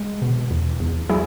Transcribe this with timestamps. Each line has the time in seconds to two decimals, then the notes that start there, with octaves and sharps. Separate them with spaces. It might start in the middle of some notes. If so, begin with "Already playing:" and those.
Already playing: G#3
0.22 B2
0.51 E2
0.80 E2
1.09 F#3 E4 G#4